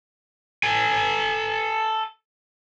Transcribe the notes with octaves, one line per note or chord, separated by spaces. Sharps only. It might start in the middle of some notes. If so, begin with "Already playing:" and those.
A4 G#5